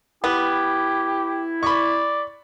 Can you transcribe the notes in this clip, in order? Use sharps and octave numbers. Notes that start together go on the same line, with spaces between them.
B3 E4 G4
D5 B5 C#6